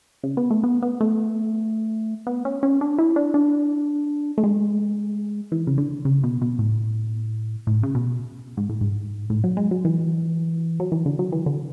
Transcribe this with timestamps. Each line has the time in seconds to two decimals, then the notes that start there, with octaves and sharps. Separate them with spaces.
0.23 C#3
0.37 B3
0.51 A3
0.64 B3
0.82 B3
1.01 A3
2.27 B3
2.45 C#4
2.63 C#4
2.81 D4
2.98 E4
3.16 D4
3.34 D4
4.38 A3
4.44 G#3
5.52 E3
5.67 C#3
5.78 D3
6.05 C#3
6.24 B2
6.42 B2
6.59 A2
7.67 A2
7.83 C#3
7.95 B2
8.57 G#2
8.69 A2
8.81 G#2
9.30 A2
9.44 F#3
9.57 G#3
9.71 F#3
9.85 E3
10.80 F#3
10.92 E3
11.06 D3
11.19 F#3
11.32 E3
11.46 D3